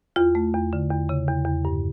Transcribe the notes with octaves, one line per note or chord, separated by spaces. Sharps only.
E2 F4
A3
E2
D3
E2
C#3
E2
E2
G2